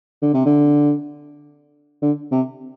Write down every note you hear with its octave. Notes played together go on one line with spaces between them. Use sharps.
D3
C3
D3
D3
C3